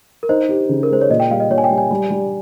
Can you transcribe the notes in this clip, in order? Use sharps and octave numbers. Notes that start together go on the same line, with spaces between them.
A#4
D#4 C5
G4
C#3
A#4
G#3 C5
C#5
A#2 D#5
G5
G3 F5
D#5
A#2 C#5
G#5
G5
G3
G#5
G3
G3